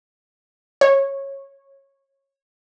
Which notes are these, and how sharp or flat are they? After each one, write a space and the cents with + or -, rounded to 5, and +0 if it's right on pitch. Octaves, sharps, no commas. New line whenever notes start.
C#5 -15